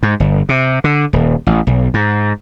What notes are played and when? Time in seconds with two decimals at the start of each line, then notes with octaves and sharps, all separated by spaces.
0.03 G#2
0.20 G1
0.49 C3
0.84 D3
1.13 D#1
1.47 A1
1.67 B1
1.94 G#2